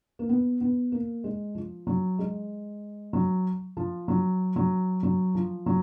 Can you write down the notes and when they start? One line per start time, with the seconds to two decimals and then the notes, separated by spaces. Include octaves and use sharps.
0.19 A#3
0.29 B3
0.61 B3
0.92 A#3
1.24 G#3
1.55 F3
1.87 F#3
2.19 G#3
3.13 F#3
3.77 F3
4.08 F#3
4.56 F#3
5.03 F#3
5.35 F3
5.66 F#3